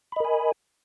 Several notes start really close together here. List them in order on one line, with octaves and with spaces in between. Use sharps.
B5 D#5 A#4 G#5